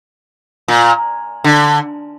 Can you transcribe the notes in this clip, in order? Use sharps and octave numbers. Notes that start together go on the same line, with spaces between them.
A#2
D3